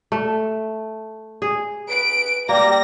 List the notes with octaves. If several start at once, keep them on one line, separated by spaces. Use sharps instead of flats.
A3
G#4
B4 D7
G3 A#3 D5 A#6